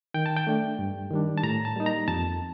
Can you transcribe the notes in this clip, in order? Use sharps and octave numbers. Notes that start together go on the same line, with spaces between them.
D#3 G5
A5
G5
A3 D4
G2
D#3 G3 D4
A5
A2 A#5
A5
G3 A#3 D#4
A#5
F2 A5